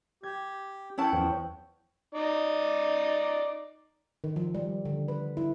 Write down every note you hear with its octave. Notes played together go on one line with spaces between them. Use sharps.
G4 G#6
C#4 E4 C#5 F#5 G5 A5
E2 F3
D#4 D5
D#3
F3
G3
D3
B4
E4